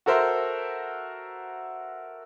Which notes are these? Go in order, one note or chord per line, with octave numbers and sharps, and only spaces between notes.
F#4 A4 A#4 C5 E5